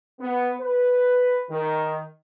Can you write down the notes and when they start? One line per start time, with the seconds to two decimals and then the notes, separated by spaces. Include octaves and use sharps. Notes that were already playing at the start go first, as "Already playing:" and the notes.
0.20 B3
0.61 B4
1.51 D#3